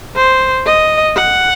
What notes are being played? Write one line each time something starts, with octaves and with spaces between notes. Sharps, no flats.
C5
D#5
F#5